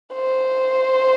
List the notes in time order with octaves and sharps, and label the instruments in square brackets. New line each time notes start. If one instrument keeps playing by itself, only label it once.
[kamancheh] C5